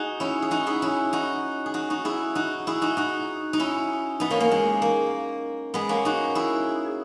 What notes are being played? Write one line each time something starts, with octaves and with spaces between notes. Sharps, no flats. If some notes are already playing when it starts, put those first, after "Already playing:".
Already playing: D#4 F#4 G#4
C#4 E4
G#4
D#4 F#4
E4 G#4
C#4 E4
D#4 F#4
G#4
D#4 F#4
D#4 F#4
E4 G#4
D#4 F#4
E4 G#4
D#4 F#4
D#4 F#4
D#4
C#4 E4
B3 D#4
A#3 C#4
A#3
G#3
A#3
G#3 B3
A#3 C#4
D#4 F#4
E4 G#4